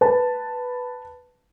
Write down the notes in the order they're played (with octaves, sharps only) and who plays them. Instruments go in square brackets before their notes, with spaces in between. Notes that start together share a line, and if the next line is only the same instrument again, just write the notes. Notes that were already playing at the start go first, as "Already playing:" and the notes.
[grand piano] B4 A5